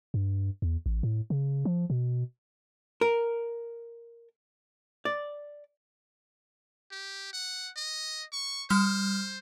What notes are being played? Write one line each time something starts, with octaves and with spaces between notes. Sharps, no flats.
G2
E2
A1
A2
C#3
F3
B2
A#4
D5
G4
F#5
D#5
C#6
G3 C5 F6